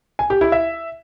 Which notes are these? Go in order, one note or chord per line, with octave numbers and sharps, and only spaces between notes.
G#5
G4
E4
E5